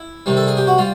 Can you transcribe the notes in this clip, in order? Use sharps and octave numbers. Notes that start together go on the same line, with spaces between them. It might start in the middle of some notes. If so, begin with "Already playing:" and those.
Already playing: E4
C3 D#3 G3
A4
G#4
G4
F#4
G3 F4